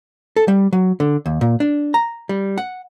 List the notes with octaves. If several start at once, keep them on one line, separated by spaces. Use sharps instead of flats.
A4
G3
F#3
D3
D#2
A#2
D4
A#5
G3
F#5